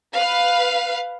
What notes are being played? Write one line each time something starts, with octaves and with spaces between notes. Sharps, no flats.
B4 F5